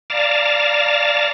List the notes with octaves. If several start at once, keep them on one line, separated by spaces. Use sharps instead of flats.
D5 F5 A5 A#5